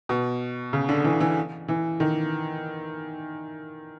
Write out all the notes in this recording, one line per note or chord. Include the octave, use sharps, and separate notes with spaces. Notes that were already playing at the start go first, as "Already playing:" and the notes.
B2
C#3
D3
E3
E3
E3
D#3